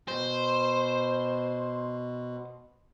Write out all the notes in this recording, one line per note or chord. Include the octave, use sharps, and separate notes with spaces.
B2 C5